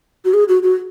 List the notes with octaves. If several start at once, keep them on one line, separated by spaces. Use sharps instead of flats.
F#4
G#4
F#4
F#4